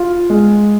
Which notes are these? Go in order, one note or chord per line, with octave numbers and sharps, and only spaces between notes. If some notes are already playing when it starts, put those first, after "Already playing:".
Already playing: F4
G#3